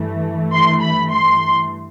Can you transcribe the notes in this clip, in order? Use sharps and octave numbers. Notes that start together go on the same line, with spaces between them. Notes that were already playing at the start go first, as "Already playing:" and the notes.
Already playing: G2 E3 A3
C6
B5
C6